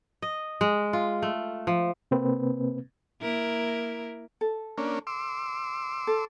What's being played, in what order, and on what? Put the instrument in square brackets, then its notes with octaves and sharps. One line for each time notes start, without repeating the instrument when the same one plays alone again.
[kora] D#5
G#3
F4
A3
F3
[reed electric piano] C3 A#3 C4 B4
[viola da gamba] A#3 E4 A#4
[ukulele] A4
[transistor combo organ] A#3 C#4 D4
C6 D6 E6
[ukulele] A4